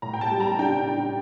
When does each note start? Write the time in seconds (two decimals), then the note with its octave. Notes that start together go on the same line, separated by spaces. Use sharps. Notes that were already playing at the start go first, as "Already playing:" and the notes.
0.02 A2 A#5
0.14 G5
0.21 A5
0.31 G3
0.40 A#5
0.59 D4 G5
0.87 D4